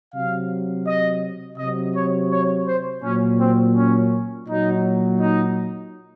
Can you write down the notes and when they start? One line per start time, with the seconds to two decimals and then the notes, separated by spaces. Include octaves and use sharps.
0.13 C3 F#3 F5
0.86 D#5
1.58 C3 F#3 D#5
1.94 C#5
2.31 C#5
2.66 C5
3.03 A#2 F#3 C#4
3.39 C4
3.74 C#4
4.47 A#2 F#3 D#4
5.19 D#4